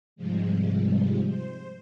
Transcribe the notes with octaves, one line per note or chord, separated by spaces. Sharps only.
G#2 C3 F3 G3 G#3
C5